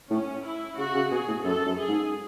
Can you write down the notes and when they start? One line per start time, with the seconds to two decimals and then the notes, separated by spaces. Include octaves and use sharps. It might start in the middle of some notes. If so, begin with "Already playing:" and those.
0.10 A2 C#4
0.44 E4
0.78 C#3 F#4
0.95 C#3
1.10 B2 G#4
1.27 A2
1.44 F#2 A4
1.66 F#2
1.78 G#4
1.88 G#2